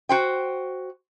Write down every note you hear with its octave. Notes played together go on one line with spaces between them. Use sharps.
F#4 C5 G5